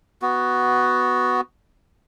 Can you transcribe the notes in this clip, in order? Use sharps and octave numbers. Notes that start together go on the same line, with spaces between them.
B3 F#4